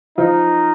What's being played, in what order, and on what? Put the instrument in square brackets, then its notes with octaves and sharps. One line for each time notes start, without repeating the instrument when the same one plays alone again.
[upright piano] F3 F4 [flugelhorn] D#4